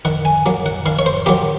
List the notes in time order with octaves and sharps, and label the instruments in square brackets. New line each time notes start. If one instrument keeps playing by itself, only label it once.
[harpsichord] D#3 F#5
G#5
F#3 A#3
F#5
D#3 F5
C#5
C5
F#3 A#3 G4